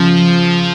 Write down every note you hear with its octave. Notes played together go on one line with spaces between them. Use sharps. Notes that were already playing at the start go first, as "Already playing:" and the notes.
Already playing: C#3 F3